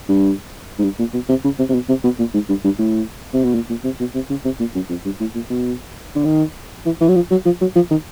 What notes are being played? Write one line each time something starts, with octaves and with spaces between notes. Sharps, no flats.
G2
G#2
G2
A#2
B2
C3
C#3
C3
C3
B2
C3
B2
A#2
G#2
G2
G2
A2
C3
B2
A#2
A#2
C3
B2
C3
C#3
C3
A#2
F#2
F2
G2
A2
A#2
B2
D3
D#3
E3
E3
F#3
F3
F#3
F3
F#3
F3
D#3